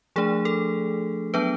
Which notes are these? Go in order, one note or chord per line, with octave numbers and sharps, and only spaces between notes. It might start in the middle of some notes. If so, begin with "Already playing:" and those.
F3 A3 D4 G#4
A4
F#3 B3 D4 B4